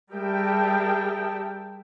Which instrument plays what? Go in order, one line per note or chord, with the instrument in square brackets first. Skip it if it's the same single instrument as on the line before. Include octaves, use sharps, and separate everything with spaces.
[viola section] G3 G#4 A#4 E5 G5 A5